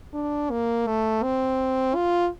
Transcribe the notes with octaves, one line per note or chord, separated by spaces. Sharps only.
D4
A#3
A3
C4
F4